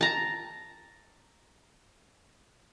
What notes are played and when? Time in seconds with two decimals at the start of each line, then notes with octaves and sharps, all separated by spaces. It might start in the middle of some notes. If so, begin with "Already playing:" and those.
0.01 A5 A#5